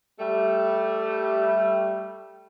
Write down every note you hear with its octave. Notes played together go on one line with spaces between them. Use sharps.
G3 A3